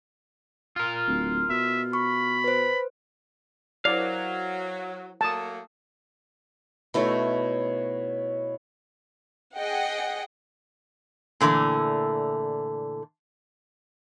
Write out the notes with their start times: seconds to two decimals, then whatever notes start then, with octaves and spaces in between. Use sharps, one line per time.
0.76 F4 A#4
1.07 D1
1.50 B2 E5
1.93 B5 C#6
2.44 B4 C5
3.85 F#3 E4 A#4 C5 D5 F5
5.21 F#3 A3 A#3 A5 D#6
6.94 B2 A3 D#4 E4 C#5
9.57 G#4 D#5 F#5 G5
11.41 A#2 D3 E3 A3